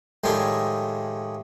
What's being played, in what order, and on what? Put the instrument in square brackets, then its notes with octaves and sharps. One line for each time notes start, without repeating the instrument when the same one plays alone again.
[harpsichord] A2 D#3 F3 G3 G#3 C5